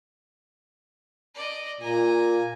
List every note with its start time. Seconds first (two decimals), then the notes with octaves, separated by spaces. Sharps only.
1.35 D5 D#5
1.81 A#2 G#5 A#5